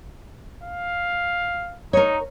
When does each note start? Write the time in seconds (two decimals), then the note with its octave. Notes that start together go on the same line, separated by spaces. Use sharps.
0.63 F5
1.93 D#4 A#4 C#5